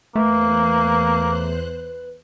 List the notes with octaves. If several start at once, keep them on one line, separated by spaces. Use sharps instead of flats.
E2 A3 A#3 B4 C5 F#6